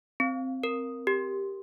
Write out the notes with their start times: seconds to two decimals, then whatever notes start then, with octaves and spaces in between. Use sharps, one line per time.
0.20 C4
0.64 A#4
1.07 G4